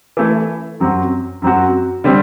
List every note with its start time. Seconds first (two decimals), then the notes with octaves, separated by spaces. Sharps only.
0.17 E3 A3 E4
0.80 F#2 F#3 C4 F#4
1.42 F#2 F#3 C4 F#4
2.04 D3 G3 C4